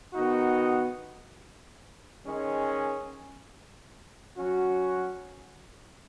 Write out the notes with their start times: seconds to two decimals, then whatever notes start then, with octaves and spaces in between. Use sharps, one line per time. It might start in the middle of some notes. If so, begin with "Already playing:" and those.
0.13 D#3 B3 D#4 F#4
2.25 D#3 G#3 C#4
4.36 F#3 C#4 F#4